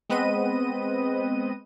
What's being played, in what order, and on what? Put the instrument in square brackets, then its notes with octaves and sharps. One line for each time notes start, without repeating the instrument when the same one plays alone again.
[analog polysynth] G#3 B3 C4 B4 D#5 D#7